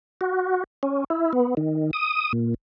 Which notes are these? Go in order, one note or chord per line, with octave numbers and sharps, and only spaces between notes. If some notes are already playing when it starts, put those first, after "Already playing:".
F#4
C#4
E4
B3
D#3
D#6
A#2